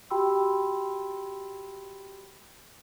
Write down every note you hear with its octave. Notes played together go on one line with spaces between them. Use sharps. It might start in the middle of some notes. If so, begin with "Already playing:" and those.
F#4 G4 G5 B5 C6 E6